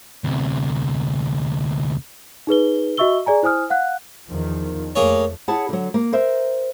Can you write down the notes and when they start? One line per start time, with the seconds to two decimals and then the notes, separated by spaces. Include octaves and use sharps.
0.24 D2 C3
2.47 D#4 G#4 B4 G7
2.97 F#4 D#5 E5 C#6 E6 G7
3.26 G#4 D5 G#5 A#5
3.43 E4 C5 G#5 D#6 F6
3.70 F5 F#5 F#6
4.29 E2 D#3 F3
4.95 F2 A3 A#3 G#4 C#5
5.48 E4 G#4 C#5 F#5 A5
5.69 D3 F#3
5.94 A#3
6.13 A#4 C5 E5